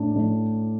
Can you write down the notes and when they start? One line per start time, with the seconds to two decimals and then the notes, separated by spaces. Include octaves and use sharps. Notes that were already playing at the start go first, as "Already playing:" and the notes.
Already playing: A2 D4
0.16 A2